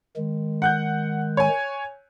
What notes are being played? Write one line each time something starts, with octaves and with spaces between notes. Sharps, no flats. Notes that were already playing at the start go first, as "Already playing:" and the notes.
D#3 G#3
F#5 F#6 G6
C#5 G#5